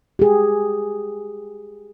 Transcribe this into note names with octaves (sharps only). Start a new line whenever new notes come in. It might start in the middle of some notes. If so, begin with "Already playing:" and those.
G4 G#4